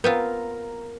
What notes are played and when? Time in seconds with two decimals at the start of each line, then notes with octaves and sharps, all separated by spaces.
0.04 B3 C4 F4 A#4